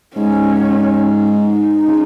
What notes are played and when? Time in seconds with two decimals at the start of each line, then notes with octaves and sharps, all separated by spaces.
0.16 G#2 C#4
1.31 D#4
1.87 C#3